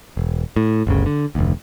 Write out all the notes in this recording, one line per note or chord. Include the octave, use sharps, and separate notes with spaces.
E1
A2
G1 D2 C#3
D3
F1 D2